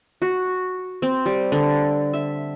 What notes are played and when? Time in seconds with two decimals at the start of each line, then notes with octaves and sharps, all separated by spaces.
0.22 F#4
1.02 C4
1.26 G3
1.52 D3
2.13 E5